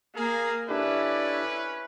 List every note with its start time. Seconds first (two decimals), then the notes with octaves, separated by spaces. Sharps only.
0.15 A#3 G#4 A#4 F5
0.69 C#4 D4 E4 G4 A4 B4 D5